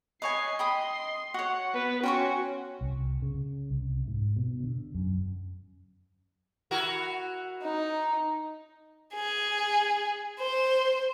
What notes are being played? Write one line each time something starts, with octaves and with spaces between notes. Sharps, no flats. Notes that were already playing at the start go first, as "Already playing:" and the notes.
B4 C#5 D#5 G#5 C7
G5 B5 C6 D#6
F#4 C#5 F#5
B3 B4
C#4 F#4 G5 C6 C#6
C2
C#3
C2
G#2
B2
D3
F#2
E4 F#4 A#4
D#4
G#4
C5